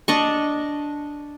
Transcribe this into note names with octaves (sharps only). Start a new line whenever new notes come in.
D4 D#5 C#6